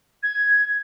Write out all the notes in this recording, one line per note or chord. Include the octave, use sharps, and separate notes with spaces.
G#6